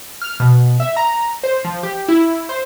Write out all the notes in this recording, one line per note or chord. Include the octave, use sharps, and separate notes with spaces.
F6
B2
E5
A#5
C5
F3
G4
E4
C5